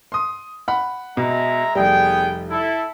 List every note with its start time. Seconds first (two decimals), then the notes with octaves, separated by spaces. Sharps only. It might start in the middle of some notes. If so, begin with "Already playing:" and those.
0.12 C6 D#6
0.68 F#5 B5
1.17 B2 G#3 E5 A#5
1.75 F1 G3 B3 G#4 G5
2.50 E4 A4